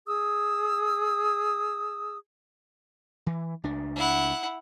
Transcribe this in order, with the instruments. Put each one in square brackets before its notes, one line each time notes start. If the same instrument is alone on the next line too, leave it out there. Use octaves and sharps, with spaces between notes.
[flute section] G#4 D#6 E6
[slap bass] E3
C#2 D4
[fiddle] E4 F#5